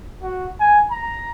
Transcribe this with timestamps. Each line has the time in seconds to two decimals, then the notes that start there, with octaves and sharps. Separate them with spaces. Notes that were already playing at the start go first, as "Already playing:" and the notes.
0.22 F#4
0.60 G#5
0.91 A#5